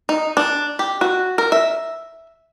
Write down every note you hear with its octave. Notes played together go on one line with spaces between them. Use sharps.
D#4
D4
G4
F#4
A#4
E5